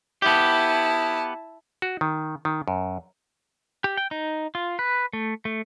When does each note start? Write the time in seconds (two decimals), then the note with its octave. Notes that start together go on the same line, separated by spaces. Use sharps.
0.22 B3 E4 G4 A5
1.82 F#4
2.01 D#3
2.45 D#3
2.68 F#2
3.84 G4
3.97 G5
4.11 D#4
4.55 F4
4.79 B4
5.13 A3
5.45 A3